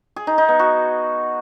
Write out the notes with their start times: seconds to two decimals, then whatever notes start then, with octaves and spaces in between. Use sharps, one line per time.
0.16 G#4
0.27 D#4
0.38 D#4
0.49 B3
0.59 F#4